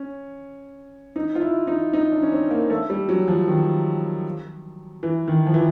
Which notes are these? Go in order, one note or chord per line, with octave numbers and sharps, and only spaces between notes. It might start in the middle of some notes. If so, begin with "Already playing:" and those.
Already playing: C#4
D#4
F4
E4
D#4
D#4
D4
C#4
C4
A#3
A3
G3
F#3
F3
D#3
E3
D#3
F3
E3